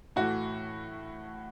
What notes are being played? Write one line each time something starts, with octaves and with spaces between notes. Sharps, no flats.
A2 E3 A3 F#4